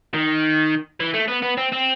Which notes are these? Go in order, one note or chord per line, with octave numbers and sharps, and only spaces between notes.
D#3
E3
A3
B3
B3
C4
C4